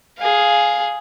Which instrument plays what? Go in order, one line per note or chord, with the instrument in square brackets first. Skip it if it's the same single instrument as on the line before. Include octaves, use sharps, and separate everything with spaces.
[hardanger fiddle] G#4 F5